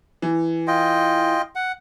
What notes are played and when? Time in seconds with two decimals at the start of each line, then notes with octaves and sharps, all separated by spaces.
0.22 E3
0.67 F4 D#5 G5
1.55 F#5